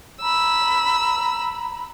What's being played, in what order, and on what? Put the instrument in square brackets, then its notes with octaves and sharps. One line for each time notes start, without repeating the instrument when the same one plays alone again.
[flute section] A#5 B5 [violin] E6